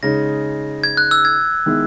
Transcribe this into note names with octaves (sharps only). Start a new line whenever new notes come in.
C#3 G#3 D#4 A#6
G#6
F#6
E6
G#6
D#3 G#3 B3 E4